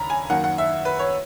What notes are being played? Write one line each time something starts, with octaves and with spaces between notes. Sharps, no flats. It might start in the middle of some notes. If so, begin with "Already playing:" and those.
Already playing: D#2 C#3 A#5 B5
G#5
F#2 D#3 A#3 F#5
F#5
E5
B4
C#5